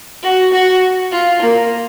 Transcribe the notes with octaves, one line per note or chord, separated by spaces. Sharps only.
F#4
F#4
F4
A#3